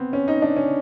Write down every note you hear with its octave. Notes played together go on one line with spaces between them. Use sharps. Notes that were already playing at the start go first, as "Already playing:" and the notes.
Already playing: B3 C4
C#4
D#4
D4
C#4